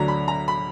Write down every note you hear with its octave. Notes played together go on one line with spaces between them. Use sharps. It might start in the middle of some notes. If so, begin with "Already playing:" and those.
Already playing: D2 D3 F#3 D4 A#5
B5
A#5
B5